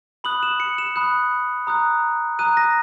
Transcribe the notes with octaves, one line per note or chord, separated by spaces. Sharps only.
B5 D#6 F#6 F#7
E7
C#7
E7
B5 D#6 F#6
A#5 D#6 F#6
A#5 D#6 F#6 D#7
A#6